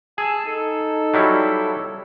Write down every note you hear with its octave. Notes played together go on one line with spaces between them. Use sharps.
G#4 A5 E6
D#4 A4
F#3 G3 E4